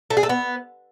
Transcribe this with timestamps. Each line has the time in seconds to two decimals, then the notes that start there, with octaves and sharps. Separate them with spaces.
0.10 A3
0.17 G#4
0.23 A3
0.29 B3